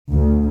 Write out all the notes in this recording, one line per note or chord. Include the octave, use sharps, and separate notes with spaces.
D2